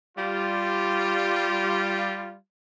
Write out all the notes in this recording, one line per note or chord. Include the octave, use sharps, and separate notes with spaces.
G3 F4